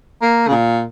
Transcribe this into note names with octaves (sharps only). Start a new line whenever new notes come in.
A#3
C#3
A#2